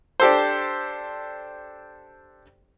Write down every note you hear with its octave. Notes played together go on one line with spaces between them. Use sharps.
D4 G4 A4 C5